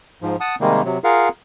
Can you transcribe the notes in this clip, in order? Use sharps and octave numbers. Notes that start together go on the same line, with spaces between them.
G#2 F3
F#5 A5 D#6
C3 D#3 G3 G#3 A#3
C3 F#3
F4 G#4 A#4 F5 F#5